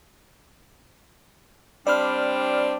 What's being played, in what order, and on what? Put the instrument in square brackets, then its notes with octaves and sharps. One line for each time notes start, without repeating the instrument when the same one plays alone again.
[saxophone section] G3 C4 D4 [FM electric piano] D5 B5 F6